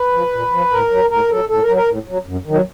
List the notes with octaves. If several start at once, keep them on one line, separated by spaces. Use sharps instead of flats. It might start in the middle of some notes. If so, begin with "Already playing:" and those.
Already playing: B4
F3
A#2
F3
A2 A#4
F#3
A2 A#4
F#3 A4
A2 A4
A#4
F#3
A#4
A2
F#3
F#2
D#3 F#3